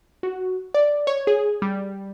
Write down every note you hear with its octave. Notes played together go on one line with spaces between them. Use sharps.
F#4
D5
C#5
G#4
G3